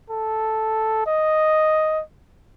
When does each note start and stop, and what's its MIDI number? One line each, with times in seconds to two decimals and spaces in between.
0.10 1.03 69
1.06 2.01 75